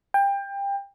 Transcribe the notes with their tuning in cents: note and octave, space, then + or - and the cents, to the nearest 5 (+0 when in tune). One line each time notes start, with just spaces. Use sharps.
G5 +25